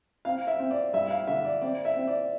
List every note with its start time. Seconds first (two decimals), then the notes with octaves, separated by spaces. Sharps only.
0.25 C4 F5
0.47 E5
0.60 C4
0.71 D5
0.93 G2 E5
1.11 F5
1.27 D3 E5
1.45 D5
1.61 C4 D5
1.85 E5
1.96 C4
2.07 D5